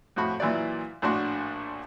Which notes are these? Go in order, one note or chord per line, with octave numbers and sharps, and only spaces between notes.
F2 A2 F#4 B5
A#2 E3 F#3 D5
A#1 A2 D4 F#4 C6